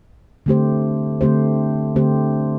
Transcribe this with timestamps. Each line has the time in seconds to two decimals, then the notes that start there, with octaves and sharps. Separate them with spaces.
0.46 D3 A3 C4 G4 C5
1.21 D3 A3 C4 G4 C5
1.96 D3 A3 C4 G4 C5